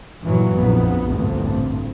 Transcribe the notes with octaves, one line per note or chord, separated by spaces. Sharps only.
G2 A#2 E3 F#3
A#1 F2 B3
A1 D2 G2 A#2 C4